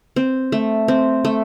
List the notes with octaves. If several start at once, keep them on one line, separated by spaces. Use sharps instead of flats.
C4
A3
C4
A3